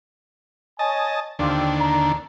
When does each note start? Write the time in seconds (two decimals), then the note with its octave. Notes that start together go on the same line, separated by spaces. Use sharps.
0.79 C#5 D#5 G#5 A5
1.39 D#2 D3 C4 D4 F4 G4
1.80 A#5